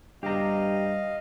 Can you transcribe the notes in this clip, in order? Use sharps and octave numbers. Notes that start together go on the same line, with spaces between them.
G2 G4 D#5 F5 A#5